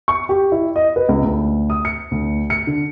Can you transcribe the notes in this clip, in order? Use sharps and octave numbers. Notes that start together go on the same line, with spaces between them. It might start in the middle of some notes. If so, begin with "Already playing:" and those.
C#6
G4
E4
D#5
B4
C#2
D2
D#6
C#7
D2
C#7
D3